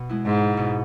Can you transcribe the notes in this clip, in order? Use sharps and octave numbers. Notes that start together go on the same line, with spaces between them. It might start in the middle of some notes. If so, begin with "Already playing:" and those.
Already playing: B2
G#3 B3 E4
G#2
B2